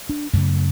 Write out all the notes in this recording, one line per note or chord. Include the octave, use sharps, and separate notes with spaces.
D4
F#2 C#3 A3